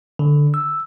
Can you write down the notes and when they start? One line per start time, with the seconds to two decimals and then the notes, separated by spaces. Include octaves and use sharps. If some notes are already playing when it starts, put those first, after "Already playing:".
0.19 D3
0.54 E6